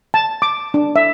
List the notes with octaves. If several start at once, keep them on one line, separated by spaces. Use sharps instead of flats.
A5
D6
D4
E5